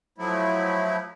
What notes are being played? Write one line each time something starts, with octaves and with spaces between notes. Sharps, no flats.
F3 F#3 A3 E4